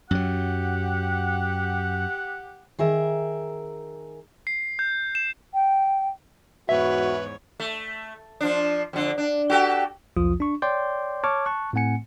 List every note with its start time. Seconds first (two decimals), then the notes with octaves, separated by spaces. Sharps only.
0.11 F#2 F#3 G4 F#5
2.79 D#3 G#4 A#4 E5
4.47 C7
4.79 G6
5.15 E7
5.54 G5
6.69 E2 G#2 F#4 B4 C#5 E5
7.60 A3
8.41 F3 D4
8.93 F2 D3
9.18 D4
9.50 F#4 G4 A4
10.17 B1 E2 F3 F4 D#6
10.40 D4 C#6
10.62 C#5 D5 G5 C6 D6 G6
11.24 C#5 A5 C#6 D6 F6 G#6
11.46 A5 C#6 F#6
11.73 A2 A3 C4 F#5 G#5 C#7